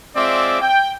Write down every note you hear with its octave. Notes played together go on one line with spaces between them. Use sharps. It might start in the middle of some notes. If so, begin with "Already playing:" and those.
G#3 C4 F4 D5 E5 D6
G5